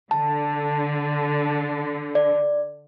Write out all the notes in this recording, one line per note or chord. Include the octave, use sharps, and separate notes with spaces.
D3 A5
D5